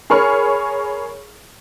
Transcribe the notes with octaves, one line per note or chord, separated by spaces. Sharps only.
G#4 A#4 C#5 B5 C#6 F6